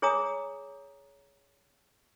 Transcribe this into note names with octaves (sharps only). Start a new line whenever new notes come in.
G#4 C#5 G#5 A#5 D#6